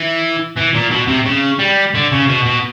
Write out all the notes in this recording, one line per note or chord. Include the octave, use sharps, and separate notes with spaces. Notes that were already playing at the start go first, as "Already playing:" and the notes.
Already playing: E3
E3
A#2
B2
C3
C#3
G3
D3
C#3
B2
B2